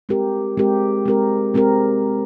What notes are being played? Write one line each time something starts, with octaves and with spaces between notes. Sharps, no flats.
G#3 C4 G4 A#4
G#3 C4 G4 A#4
G#3 C4 G4 A#4
G#3 C4 G4 A#4